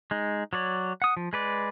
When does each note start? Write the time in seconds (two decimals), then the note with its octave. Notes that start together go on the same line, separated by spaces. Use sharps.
0.11 G#3 D#4
0.53 F#3 C#5 D5
1.02 F#5 D#6
1.17 F3
1.33 G#3 B4 D5